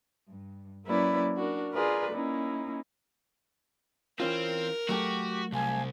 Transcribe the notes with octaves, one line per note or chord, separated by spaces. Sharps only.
G2
F#3 A#3 C#4 E4 B4 D5
D4 F#4 A#4
F4 G#4 A#4 B4 D5
A#3 C#4 D#4 E4
E3 C4 C#4 F4 A#4
F#3 A3 F#4 G4 G5
C2 F5 G#5 A5